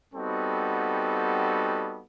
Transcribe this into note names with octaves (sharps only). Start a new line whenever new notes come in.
G3 B3 C4 D#4 F#4 A4